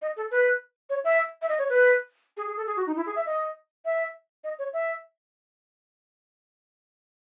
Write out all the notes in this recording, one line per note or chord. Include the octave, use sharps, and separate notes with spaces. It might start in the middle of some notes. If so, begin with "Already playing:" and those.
D#5
A4
B4
C#5
E5
E5
D#5
C#5
B4
G#4
G#4
A4
G#4
F#4
D#4
E4
G#4
E5
D#5
E5
D#5
C#5
E5